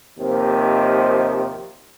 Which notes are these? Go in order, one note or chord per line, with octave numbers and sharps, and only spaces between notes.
D#2 C3 D#3 F3 A#3